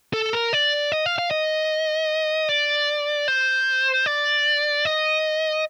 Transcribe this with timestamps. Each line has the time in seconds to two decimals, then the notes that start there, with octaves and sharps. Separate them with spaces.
0.13 A4
0.33 A#4
0.53 D5
0.92 D#5
1.06 F5
1.18 F5
1.31 D#5
2.49 D5
3.28 C5
4.06 D5
4.85 D#5